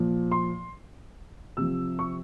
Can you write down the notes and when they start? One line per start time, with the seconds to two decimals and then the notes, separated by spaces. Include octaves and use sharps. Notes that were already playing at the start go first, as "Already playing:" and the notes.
Already playing: A#2 F3
0.32 C6
1.57 C3 F3 E6
1.99 C#6